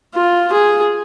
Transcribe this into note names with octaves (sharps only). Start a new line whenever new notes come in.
F4
G#4